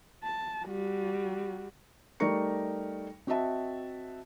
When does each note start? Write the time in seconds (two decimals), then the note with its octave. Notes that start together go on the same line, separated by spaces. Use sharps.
0.24 A5
0.66 G3 F#4
2.20 G3 A3 D#4 A#4 C#6 C#7
3.27 C4 F#4 D#5 E5 A5